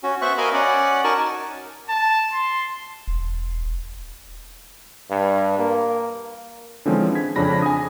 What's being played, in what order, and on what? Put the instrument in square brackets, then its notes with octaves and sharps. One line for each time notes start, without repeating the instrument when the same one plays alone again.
[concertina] C#4 F#4
B3 C5 E5 C#6 F#6
F#4 A#4 D#5 F5 G#5 B5
C#4 D5 F#5
D#4 F#4 A#4 G#5 A5 C#6
[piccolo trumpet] A5
C6
[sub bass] E1
[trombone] G2
A#3
[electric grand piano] D3 E3 F3 G#3 C4 C#4
G#6 B6
F2 C#3 C#4 D4 B5 A#6
G#5 D#6